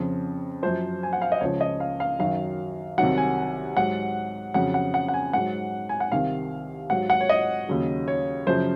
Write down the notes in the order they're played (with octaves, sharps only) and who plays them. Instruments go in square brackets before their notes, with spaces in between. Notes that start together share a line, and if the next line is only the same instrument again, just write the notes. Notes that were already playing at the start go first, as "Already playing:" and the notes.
Already playing: [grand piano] F2 C#3 F3
F#2 F3 C5
G#5
F#5
F5
D#5
C#2 C#3 F3 C#5
D#5
F5
F5
F#2 D#3 F#3 F5
C2 C3 D#3 F#3 F#5
G#5
G#2 F#3 F#5
F2 C#3 F#3 F#5
F#5
F#5
F#5
G#5
G#2 F#3 F#5
G#5
F#5
C2 C3 D#3 F5
G#2 F#3 F#5
F#5
C#5
D#5
D#2 C#3 F#3
C#5
F#2 C#3 F3 C5